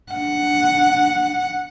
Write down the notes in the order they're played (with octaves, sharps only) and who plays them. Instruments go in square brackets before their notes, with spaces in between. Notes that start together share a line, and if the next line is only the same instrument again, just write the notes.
[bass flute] D4 [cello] F#5